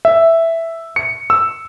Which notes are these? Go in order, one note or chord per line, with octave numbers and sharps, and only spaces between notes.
E5
C#7
E6